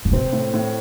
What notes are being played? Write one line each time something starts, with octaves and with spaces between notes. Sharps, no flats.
D3
C3 C4
A2
A2